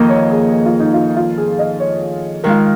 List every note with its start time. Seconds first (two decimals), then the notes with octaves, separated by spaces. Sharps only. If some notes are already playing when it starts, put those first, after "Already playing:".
Already playing: F2 D#3 A#3 D#5
0.09 C#5
0.31 G#4
0.52 G#4
0.66 F4
0.80 D#4
0.94 F4
1.16 F4
1.38 G#4
1.59 D#5
1.80 C#5
2.44 D#3 G#3 F4 A#4